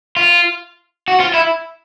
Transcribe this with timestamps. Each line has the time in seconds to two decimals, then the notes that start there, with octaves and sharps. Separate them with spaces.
0.17 F4
1.08 F#4
1.20 F4
1.34 E4